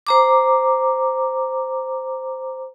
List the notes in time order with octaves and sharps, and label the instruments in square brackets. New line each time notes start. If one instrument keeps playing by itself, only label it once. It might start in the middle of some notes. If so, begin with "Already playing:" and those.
[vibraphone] C5 A#5 D6